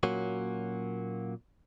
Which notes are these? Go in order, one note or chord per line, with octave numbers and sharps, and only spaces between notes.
A#2 F#3 A#3 C#4 F#4